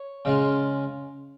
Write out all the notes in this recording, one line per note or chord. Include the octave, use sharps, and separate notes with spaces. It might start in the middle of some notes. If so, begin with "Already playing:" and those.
Already playing: C#5
C#3 G#3 F4